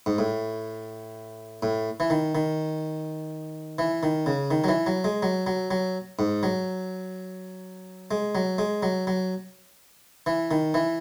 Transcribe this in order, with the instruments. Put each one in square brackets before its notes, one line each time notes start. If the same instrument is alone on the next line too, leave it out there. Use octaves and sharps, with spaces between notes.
[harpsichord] G#2
A2
A2
E3
D#3
D#3
E3
D#3
C#3
D#3
F#3
E3
F#3
G#3
F#3
F#3
F#3
G#2
F#3
G#3
F#3
G#3
F#3
F#3
E3
D#3
E3